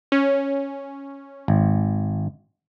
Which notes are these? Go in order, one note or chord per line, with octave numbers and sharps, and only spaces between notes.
C#4
G#1